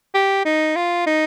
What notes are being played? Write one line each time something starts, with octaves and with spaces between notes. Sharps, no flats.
G4
D#4
F4
D#4